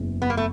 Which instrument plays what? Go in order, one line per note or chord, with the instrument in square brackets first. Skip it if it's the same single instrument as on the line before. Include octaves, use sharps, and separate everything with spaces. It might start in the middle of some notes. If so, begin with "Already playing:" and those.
Already playing: [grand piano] F#1 E2 C#3 E3
[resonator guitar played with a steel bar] B3
A#3
A3